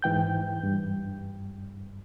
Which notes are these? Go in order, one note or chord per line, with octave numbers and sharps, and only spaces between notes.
G#2 E3 G5 G6
G2